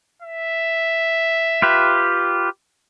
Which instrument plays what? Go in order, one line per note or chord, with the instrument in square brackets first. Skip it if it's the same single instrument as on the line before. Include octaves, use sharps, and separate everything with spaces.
[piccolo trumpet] E5
[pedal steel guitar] F4 G4 B4